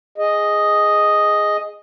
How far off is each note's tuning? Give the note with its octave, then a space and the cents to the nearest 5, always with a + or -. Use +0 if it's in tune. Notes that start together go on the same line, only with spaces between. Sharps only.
G#4 +0 D#5 +0